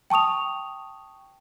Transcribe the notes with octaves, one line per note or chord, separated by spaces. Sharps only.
G5 A5 C#6 D#6 F7